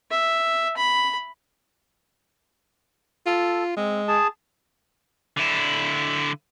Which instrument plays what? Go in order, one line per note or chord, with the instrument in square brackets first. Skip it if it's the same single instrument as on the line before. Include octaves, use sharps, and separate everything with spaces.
[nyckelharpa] E5
B5
[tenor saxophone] F4 [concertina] A4
[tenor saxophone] G#3 [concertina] C4
[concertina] G#4 A5
[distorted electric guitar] D3 E4